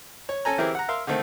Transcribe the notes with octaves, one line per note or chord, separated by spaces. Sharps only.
C#5
C#4 A4 G#5 A#5
E3 C4 E4 G4 G#4 A#4
F#5 A#5
A#4 E5 F5 C6
D3 D#3 A3 C4